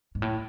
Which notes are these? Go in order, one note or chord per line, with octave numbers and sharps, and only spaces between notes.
G#2
A2